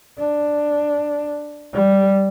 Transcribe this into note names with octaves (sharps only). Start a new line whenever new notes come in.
D4
G3